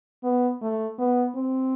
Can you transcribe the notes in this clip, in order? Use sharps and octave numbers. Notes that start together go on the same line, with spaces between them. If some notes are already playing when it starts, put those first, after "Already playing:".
B3
A3
B3
C4